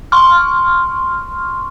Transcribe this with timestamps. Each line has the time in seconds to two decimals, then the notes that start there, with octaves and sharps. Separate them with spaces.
0.12 C6 C#6 F6